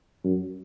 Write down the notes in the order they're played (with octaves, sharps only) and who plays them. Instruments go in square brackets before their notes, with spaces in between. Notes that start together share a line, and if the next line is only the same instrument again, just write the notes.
[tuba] F#2